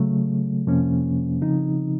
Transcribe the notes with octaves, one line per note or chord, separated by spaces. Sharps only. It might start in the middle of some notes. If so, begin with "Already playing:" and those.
Already playing: C#3 F#3 A3
F2 C3 F3 A#3 C#4
C#3 F3 C4 D#4